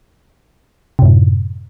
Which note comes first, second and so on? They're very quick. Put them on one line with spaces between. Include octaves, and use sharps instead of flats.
C3 F#2 A2